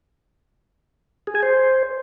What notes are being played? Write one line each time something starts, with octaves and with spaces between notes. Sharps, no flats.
G#4
G#5
C5